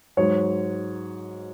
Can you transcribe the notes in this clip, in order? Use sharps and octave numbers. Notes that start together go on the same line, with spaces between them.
G#2 F#3 C#5